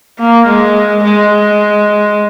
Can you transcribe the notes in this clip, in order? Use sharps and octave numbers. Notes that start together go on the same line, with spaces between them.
A#3
G#3
G#3